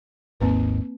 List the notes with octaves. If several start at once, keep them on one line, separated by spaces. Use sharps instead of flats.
G#1 D#2 G#2 A#3 C4 B4